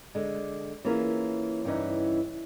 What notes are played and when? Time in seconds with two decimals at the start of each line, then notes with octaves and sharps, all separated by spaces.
0.15 D3 G#3
0.85 E3 A#3 C#4 F4 G#4 A#4
1.64 G2 C#3 E3 C#4 D#4